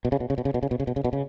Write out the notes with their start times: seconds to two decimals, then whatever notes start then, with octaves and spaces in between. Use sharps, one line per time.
0.05 B2
0.12 C#3
0.20 B2
0.30 C#3
0.38 B2
0.45 C#3
0.54 B2
0.63 C#3
0.71 B2
0.80 C#3
0.87 B2
0.96 C#3
1.04 B2
1.13 C#3